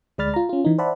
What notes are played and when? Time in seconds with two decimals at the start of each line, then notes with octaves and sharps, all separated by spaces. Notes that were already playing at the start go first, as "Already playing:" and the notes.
0.18 D2 G#3 D5 B5 F6 A6
0.34 F4 A#5
0.49 C#4 F4
0.65 E3 D#4
0.78 C5 D5 E5 F#5 A5 B5